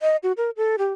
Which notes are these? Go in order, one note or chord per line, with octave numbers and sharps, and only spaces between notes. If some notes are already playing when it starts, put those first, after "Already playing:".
D#5
F#4
A#4
A4
G4